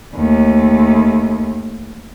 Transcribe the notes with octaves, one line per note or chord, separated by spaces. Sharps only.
D#2 A3